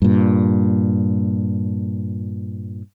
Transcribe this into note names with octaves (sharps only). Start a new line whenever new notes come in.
G2 A#2